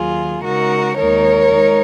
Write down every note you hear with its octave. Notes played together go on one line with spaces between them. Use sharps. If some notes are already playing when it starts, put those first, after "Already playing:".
Already playing: D#2 D#3 F#3 F4 G#4
C#3 G#3 D#4 F#4 A#4
D#2 D#3 G#3 D#4 A#4 C#5
G#3 D#4